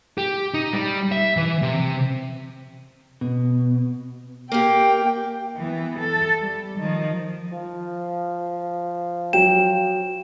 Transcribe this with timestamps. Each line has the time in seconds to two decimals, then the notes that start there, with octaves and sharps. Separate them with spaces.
0.18 G4
0.54 D#4
0.73 G3
1.12 E5
1.37 E3
1.62 C3
3.21 B2
4.52 A#3 G4 G5
5.57 E3 B3
6.00 A4
6.41 G3
6.79 D#3 F3
7.53 F3
9.33 F#3 G5 E7